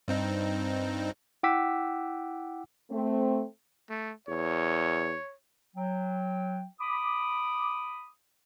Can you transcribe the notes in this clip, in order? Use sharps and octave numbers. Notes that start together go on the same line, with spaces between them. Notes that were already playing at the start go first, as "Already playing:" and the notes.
G2 C4 D#4
E4 F#5 G5 D6 E6 B6
A3 C4
A3
E2 C#5
F#3 G5
B5 D6 D#6